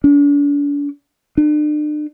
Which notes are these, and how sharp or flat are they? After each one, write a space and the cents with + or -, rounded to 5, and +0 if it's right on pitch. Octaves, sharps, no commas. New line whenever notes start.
D4 -40
D4 +40